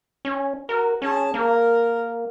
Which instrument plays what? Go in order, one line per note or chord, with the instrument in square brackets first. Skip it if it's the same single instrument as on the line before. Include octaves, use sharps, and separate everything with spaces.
[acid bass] C#4
[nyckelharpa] F#4 [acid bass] A#4
[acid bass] C#4 [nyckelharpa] G#4 A5
[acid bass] A#3 [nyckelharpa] A#4